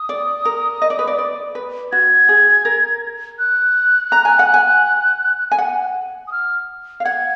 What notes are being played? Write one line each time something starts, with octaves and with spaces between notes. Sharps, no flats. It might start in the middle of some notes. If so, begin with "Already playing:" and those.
Already playing: D#6
D5
A#4
D#5
D5
B4
D5
D5
B4
F#4 G#6
G#4
A#4
F#6
A#5
G#5
F#5
G#5
G#5
F#5
D#6
F6
F5
F#5 G#6